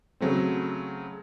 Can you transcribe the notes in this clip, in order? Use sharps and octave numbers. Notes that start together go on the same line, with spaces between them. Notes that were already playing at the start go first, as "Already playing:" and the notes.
C#3 F#3 A3 C4